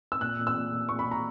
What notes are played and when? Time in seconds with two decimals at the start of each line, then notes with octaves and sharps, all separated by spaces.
0.12 E6
0.21 A#2 F#6
0.39 A#2
0.47 E6
0.55 A#2
0.73 A#2
0.89 A#2 C#6
0.99 B5
1.07 A#2 A#5